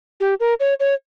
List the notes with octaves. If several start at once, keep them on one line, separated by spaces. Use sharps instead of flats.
G4
A#4
C#5
C#5